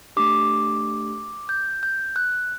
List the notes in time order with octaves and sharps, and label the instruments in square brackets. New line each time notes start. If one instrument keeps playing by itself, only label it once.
[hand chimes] A3 D4 G4 D6
G6
G6
F#6